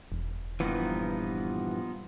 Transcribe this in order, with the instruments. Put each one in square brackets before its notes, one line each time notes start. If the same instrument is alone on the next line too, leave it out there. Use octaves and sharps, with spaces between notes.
[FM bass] E1
[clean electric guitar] G2 A#2 E3 [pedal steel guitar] F3 B3 D#4